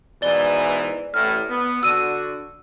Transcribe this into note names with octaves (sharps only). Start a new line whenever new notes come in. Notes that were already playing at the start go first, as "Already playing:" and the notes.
G#2 B2 E3 D5 G7
A1 A2 F6
B3
D3 D4 F#4 E6 D#7